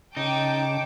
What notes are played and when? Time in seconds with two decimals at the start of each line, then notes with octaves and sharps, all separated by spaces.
0.17 C#3 D#4 G5 A5 D6